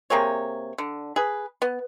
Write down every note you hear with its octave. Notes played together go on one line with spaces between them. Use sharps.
C3 A#3 G#4 C#5
D3
G#4 B4
B3